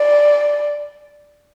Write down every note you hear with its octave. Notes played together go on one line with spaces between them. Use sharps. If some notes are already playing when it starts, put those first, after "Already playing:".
Already playing: D5